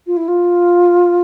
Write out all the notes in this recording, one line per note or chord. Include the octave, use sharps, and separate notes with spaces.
F4
E4
F4